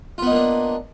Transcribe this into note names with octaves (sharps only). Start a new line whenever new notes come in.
A#3 B3 D4 D#4 F4